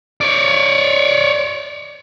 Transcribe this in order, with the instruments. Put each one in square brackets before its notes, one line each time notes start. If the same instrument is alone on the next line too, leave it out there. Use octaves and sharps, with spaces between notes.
[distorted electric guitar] C#5 D5